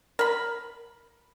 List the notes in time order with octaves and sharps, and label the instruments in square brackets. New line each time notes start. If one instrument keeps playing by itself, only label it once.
[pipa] A#4 B5